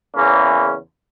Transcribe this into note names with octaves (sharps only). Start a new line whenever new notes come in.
E2 C#3 E3 A#3 C#4